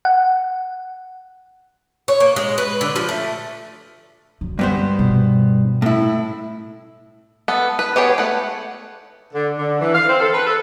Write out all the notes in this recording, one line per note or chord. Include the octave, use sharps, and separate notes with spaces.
F#5
C#5
A#3
G#3
B4
D3
F3
A3
F#2 D3
G2 B3 C5
B2
A2 E4
B3 A4
B4
B3 G4 G#4 C#5
A3 F#5
D3
D3
E3
F5
C4
A4
B4
A4